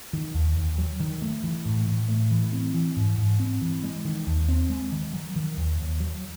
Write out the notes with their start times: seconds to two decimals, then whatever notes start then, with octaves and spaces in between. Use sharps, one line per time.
0.13 D#3
0.35 D#2
0.57 D#2
0.78 F#3
1.00 D#3
1.22 A3
1.44 E3
1.65 A2
1.88 A2
2.09 A3
2.31 E3
2.53 C4
2.74 E3
2.97 G#2
3.18 G#2
3.40 C4
3.62 E3
3.84 G#3
4.05 D#3
4.27 D#2
4.49 C4
4.70 G#3
4.92 D#3
5.13 F#3
5.36 D#3
5.57 D#2
5.79 D#2
6.00 F#3